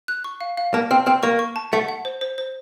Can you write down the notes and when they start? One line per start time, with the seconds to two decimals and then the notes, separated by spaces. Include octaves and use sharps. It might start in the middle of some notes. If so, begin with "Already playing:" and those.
0.08 F#6
0.24 C#6
0.41 F5
0.57 F5
0.74 A#3 A5
0.91 C4 F6
1.06 C4 F6
1.23 A#3 C#6
1.39 C#6
1.56 A5
1.73 A3 F#5
1.88 F#5
2.05 C5
2.21 C5
2.38 C5